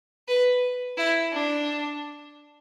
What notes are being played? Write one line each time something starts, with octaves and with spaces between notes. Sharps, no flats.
B4
E4
D4